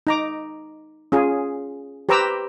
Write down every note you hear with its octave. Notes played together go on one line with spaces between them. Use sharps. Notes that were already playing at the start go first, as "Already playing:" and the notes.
D#4 A#5 D6
C#4 F4 G#4
G4 B4 C5 A#5 D6 E6